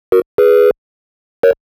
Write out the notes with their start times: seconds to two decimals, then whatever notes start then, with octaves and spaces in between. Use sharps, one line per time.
0.12 F#4 A#4
0.38 G#4 B4
1.43 A#4 C#5